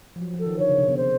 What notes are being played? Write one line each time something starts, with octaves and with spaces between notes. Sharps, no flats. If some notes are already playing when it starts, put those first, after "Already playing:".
F3
F#3
F3
A4
D#3
D3 C#5
C#3
C3
B2
C5